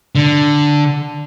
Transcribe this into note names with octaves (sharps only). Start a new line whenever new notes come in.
D3